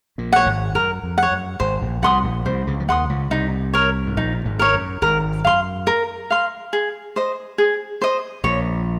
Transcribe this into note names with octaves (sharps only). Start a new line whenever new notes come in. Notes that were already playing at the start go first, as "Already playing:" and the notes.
A#1 A#2
C#5 F#5
G#1 G#2
F#2 A#4
F2
C#5 F#5
F#2
G#1 G#2 C5
A#1 A#2
C2 C3 F#5 C6 D#6
A#1 A#2
C2 C3 C5
C#2 C#3
F3
D#2 D#3 F#5 C6 D#6
C#2 C#3
C2 C3 D#4
A#4 C#5
G#2
A#1 A#2 D#4
G#1 G#2
A#4 C#5
F#2
G#1 G#2 A#4
F#2 F5 C6
A#4
F5 C6
G#4
C5 D#5
G#4
C5 D#5
A#1 A#2 C#5